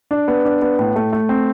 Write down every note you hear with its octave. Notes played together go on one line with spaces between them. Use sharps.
D4
B3
D4
B3
A2
A3
A3
C4